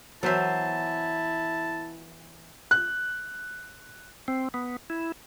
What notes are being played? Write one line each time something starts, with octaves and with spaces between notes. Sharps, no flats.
E3 F#3 B3 E4 C5 E5 A5
F#6
C4
B3
E4